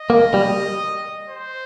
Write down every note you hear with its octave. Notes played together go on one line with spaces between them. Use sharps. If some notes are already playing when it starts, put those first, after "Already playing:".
Already playing: D#5
A#3
G3
C5